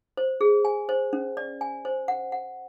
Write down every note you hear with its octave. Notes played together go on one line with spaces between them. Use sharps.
C5
G#4
G#5
C5
C#4
D5
G#5
C5
F#5
F#5